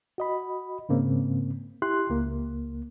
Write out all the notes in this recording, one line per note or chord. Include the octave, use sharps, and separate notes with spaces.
F#4 D#5 B5
G#2 C#3 A#3 C4
E4 G4 C6 F#6
C#2 A#3